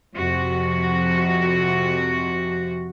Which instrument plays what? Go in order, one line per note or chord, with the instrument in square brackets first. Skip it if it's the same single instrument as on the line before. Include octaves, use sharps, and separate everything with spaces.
[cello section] F2 C3 F#4